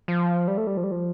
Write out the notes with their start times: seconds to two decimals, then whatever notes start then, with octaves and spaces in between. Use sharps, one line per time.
0.08 F3
0.47 G3
0.57 A3
0.67 G3
0.77 F3
0.84 G3
0.91 F3